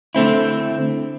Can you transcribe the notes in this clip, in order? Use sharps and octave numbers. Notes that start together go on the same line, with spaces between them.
D3 A3 C4 E4